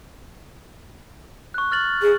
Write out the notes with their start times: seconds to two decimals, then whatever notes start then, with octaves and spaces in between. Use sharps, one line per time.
1.54 C#6 F#6
1.72 F6 A6 F#7
2.02 G#4